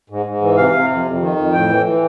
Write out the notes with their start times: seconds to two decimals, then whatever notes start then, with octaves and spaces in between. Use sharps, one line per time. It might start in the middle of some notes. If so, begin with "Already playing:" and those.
0.10 G#2
0.26 G#2
0.41 E3
0.57 C3 F5
0.73 C3
0.90 F2
1.05 F2
1.21 D#3
1.37 F2
1.52 A2 G5
1.69 E3
1.85 E3